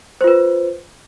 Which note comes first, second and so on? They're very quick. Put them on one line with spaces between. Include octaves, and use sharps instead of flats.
C5 F4 B4